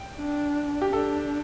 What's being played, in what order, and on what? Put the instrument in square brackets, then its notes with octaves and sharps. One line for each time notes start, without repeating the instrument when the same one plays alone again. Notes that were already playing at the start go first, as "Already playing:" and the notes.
Already playing: [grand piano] G5
[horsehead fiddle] D4
[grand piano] G4
[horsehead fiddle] D4 [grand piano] A4